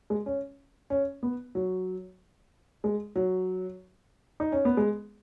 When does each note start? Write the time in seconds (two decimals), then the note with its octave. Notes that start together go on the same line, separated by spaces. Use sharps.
0.10 G#3
0.26 C#4
0.90 C#4
1.23 B3
1.55 F#3
2.84 G#3
3.16 F#3
4.40 D#4
4.52 C#4
4.65 B3
4.77 G#3